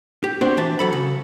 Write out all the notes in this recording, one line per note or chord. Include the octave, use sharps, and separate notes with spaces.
G4
C4 D4 F#4 C5 D5
E3 E5 A5
F#3 A4 B5
C#3